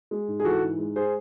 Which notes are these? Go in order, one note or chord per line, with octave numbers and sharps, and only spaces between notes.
G#3
G#2
G#4
E3 F#4 A4
G#2
G#3
G#4 C5